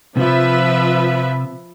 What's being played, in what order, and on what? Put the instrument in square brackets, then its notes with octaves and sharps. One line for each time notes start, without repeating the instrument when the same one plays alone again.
[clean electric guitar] C3 [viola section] F3 B4 E5